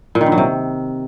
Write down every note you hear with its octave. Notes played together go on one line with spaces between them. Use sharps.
A#2
D#3
G2
F#3
C3